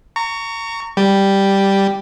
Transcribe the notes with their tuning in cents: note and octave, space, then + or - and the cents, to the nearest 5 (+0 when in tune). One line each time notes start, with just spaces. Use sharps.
A#5 -25 C#6 +15
G3 +0 G4 +0